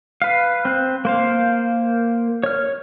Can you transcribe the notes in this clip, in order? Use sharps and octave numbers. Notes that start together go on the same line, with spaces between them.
B4 F5
C4 F#6
A#3 C5 F5
C#5 F6